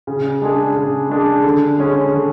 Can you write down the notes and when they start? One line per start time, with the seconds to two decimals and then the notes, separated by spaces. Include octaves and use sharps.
0.07 C#3
0.42 G#3 D4 G#4
0.76 C#3
1.10 G#3 D4 G#4
1.44 D3
1.78 G#3 C#4
2.13 D3